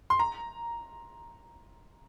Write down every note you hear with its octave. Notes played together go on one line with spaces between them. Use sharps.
C6
A#5